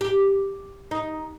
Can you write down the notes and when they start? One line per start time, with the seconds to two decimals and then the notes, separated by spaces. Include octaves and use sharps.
0.01 G4
0.91 D#4